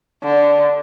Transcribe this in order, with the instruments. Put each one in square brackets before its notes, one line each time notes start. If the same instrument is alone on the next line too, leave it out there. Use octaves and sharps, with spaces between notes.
[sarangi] D3